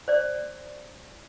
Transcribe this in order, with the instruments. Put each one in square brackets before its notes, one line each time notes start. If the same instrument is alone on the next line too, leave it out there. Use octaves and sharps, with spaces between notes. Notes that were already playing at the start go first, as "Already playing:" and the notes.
[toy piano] C5 D5